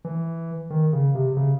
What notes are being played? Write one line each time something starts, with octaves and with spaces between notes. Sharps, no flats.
E3
D#3
C#3
C3
C#3